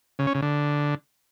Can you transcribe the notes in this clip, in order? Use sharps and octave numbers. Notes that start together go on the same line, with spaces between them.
C#3
C#4
C#3
D3